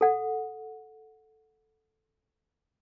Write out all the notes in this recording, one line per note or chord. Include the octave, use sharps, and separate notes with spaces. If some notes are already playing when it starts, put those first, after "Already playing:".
A4 F#5